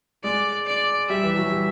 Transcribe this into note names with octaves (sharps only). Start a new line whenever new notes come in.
G#3 D5
D5
G3 E5
E3
F#3
G3